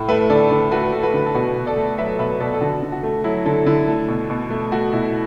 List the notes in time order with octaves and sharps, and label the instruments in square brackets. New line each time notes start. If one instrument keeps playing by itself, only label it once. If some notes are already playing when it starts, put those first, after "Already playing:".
Already playing: [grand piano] A2
A3 B4 E5
D3 A4 D5
D3 A4 D5
A3 F#4 B4
A3
F#4 B4
D3
A4
B2 F#4 B4
B2
A4 D5
A3
F#3 B4 E5
B2 B4 E5
B2 A4 D5
A4
D3 F#4
D3
F#4
A3
F#3 E4 A4
D3 E4 A4
D3 E4
A3
B2
B2
A3
A3 F#4
B2 E4